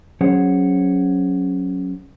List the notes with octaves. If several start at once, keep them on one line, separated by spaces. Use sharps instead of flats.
F#3 C#4 G#4 C5 C#5 F#5